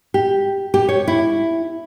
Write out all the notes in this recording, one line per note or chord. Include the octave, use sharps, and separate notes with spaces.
G4
G4
C#5
E4